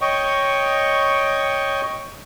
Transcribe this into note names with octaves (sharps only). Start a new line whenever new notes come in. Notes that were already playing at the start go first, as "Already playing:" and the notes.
C#5 D#5 G5 C#6